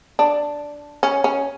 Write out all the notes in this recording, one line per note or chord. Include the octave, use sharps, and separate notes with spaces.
D4
C#4
C#4